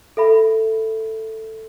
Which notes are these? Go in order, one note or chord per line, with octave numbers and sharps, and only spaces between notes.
A4 E5 B5